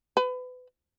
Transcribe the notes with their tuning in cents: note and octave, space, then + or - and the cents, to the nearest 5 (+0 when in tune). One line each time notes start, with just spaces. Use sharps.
B4 +30